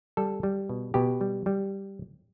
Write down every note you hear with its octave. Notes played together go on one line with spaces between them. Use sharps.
G3 A4
G3
B2
B2 G4
G3
G3